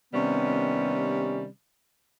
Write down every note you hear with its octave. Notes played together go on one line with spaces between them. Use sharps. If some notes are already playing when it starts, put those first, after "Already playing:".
C3 D#3 G3 B3 C#4